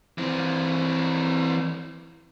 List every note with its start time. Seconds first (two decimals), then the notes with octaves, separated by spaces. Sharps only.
0.18 E3 C4